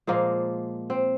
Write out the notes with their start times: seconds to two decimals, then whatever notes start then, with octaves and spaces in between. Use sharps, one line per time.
0.07 A#2 F3 G#3 A#3
0.90 C4